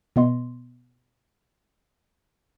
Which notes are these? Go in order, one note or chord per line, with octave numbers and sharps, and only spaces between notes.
B2 B3 D#5 C6